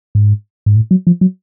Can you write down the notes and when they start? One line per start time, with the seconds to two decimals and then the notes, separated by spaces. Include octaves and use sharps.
0.15 G#2
0.66 G#2
0.76 A2
0.91 F#3
1.07 F3
1.21 F#3